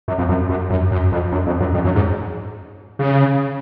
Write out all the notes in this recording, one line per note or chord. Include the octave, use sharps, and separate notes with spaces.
F#2
F2
F#2
F#2
F#2
F#2
F2
F#2
F2
F#2
F2
F#2
G#2
C#3